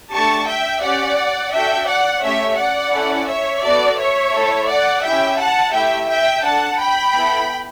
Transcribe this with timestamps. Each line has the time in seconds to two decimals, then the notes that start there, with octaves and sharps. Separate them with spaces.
0.12 A3 D4 G4 A5 C#6
0.47 E5 G5
0.82 C#4 G4 D5 F#5
1.52 D4 F#4 A4 E5 G5
1.87 D5 F#5
2.22 A3 C#4 G4 C#5 E5
2.58 D5 F#5
2.93 C#4 E4 A4
3.28 C#5 E5
3.63 B3 F#4 A4 D5
3.98 C#5 E5
4.34 A3 E4 A4
4.68 D5 F#5
5.03 C#4 E4 G4 E5 G5
5.38 F#5 A5
5.73 A3 E4 G4 E5 G5
6.09 E5 G5
6.43 D4 A4 F#5 A5
6.79 G5 B5
7.14 B3 E4 A4